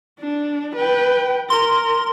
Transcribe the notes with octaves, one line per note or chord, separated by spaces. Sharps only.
D4
B4 G5
A#4 C6